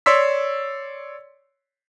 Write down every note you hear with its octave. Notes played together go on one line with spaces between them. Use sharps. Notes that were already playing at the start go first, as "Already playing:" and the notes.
C#5 D5 C6 E6 B6